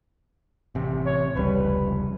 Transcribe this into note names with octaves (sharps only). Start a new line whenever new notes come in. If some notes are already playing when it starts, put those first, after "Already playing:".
A1 C3
C#5
F1 C#2 G3 B4